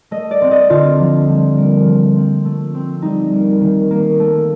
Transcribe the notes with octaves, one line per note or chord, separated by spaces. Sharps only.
A3 D#5
D5
C4
D#5
D3 F4
F3
G3
A#3
F3
C4
A3
C4
G3 D#4
A#3
D#3
A#3
A3